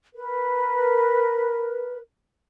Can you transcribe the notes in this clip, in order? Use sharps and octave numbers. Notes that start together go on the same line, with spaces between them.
A#4 B4